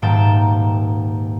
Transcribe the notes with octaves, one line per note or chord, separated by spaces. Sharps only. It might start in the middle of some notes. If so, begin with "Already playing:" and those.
D#1 G#2 A#3 G5 A5 E7